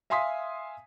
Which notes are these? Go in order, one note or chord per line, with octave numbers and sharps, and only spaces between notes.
E5 F5 G#5 C6 D#6 B6